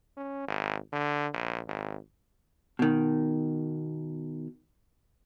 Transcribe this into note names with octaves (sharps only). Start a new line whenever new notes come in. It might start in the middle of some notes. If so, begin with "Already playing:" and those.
C#4
G#1
D3
A#1
G#1
B2 D#3